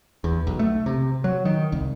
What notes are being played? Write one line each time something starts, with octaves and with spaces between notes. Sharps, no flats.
E2
B1
A3
C3
F#3
D#3
C2